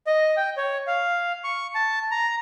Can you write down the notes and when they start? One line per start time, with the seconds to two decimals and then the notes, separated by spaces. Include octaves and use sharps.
0.07 D#5
0.37 G5
0.57 C#5
0.87 F5
1.44 C#6
1.75 A5
2.11 A#5